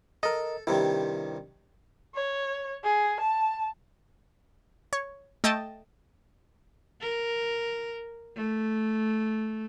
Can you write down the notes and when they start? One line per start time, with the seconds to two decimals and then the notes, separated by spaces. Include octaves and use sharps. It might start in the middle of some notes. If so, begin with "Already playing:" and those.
0.23 A4 A#4 D#5
0.67 G2 C3 D#3 E4
2.15 C#5
2.84 G#4
3.20 A5
4.93 C#5
5.44 A3 D#5 G5 A5
7.01 A#4
8.36 A3